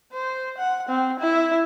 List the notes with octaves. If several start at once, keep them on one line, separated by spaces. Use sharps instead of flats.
C5
F#5
C4
E4